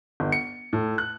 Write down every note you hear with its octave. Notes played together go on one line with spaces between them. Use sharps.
G1
C#7
A2
F#6